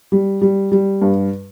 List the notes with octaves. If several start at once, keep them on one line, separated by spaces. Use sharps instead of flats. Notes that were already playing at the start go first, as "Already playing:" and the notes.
G3
G3
G3
G2